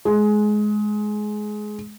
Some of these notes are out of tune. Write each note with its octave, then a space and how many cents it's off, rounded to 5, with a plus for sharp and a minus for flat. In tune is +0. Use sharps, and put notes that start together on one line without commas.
G#3 +20